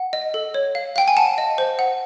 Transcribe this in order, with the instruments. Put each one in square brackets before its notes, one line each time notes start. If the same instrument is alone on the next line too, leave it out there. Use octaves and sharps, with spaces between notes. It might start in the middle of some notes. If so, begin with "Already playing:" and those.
Already playing: [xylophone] F#5
D#5
A4
C#5
F5
F5 G5
G#5
F#5 A5
D#5
C5
F#5